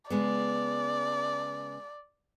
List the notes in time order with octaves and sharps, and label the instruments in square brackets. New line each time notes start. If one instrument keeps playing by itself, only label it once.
[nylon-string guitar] C#3 G#3 B3 [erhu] D5